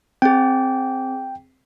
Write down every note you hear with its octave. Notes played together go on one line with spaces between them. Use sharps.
C4 G#4 G5